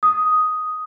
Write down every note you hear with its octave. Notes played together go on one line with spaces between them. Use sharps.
D#6